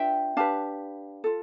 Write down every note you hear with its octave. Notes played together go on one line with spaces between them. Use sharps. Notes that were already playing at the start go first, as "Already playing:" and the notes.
Already playing: D4 F4 B4 E5 G5
D4 G4 B4 F5 A5
F4 A4